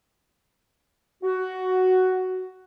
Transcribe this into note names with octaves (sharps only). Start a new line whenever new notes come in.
F#4